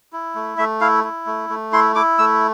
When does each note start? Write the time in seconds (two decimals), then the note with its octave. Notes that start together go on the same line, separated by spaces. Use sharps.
0.13 E4
0.35 A3
0.58 A3 E5
0.81 E4 F5
1.04 E4
1.26 A3
1.50 A3
1.73 E4 C6
1.95 E4 D6
2.18 A3 E6